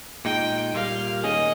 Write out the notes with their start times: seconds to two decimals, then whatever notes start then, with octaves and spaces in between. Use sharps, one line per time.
0.24 A#2 G#3 D#4 G5
0.74 A#2 G3 A#3 F5
1.23 D#3 A#3 C#4 G#4 D#5